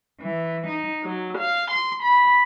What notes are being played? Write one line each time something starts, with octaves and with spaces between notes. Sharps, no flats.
E3
D#4
F#3
F5
C6
B5